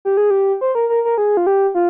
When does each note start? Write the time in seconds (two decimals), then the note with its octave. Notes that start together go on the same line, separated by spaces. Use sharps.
0.05 G4
0.17 G#4
0.30 G4
0.61 C5
0.75 A#4
0.89 A#4
1.05 A#4
1.18 G#4
1.37 F4
1.47 G4
1.75 F4